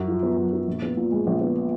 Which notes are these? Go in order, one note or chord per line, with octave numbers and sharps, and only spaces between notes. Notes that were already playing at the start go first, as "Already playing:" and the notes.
Already playing: F#2 F#4
F3
B3
F#2
F#4
A#1
B3
A#2
G#3
A#1
B3